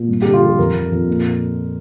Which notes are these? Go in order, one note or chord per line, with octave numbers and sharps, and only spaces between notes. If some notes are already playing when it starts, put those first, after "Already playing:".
Already playing: A#2
G2
D3 G4
F4
F3 G4
F2 A#4
F3
F2
A#2